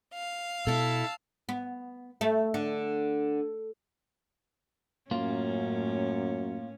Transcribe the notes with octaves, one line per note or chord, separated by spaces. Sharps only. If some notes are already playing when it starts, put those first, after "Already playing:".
F5
B2 E4 A4 A5 E6
B3
A3
D3
F#2 A2 A#3 C#4 F4